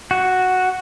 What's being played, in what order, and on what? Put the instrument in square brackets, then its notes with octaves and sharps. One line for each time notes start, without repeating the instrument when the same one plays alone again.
[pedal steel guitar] F#4